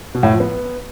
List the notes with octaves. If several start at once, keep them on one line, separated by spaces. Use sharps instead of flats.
B2
A2
F3
B3